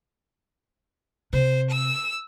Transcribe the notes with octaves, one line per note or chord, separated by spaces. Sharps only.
C3 C5
E6